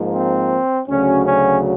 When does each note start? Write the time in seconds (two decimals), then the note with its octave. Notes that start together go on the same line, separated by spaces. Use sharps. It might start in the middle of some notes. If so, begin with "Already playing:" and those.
Already playing: G#2 F3 A#3
0.14 C4
0.88 D2 C#3 F#3 C#4
1.26 C#4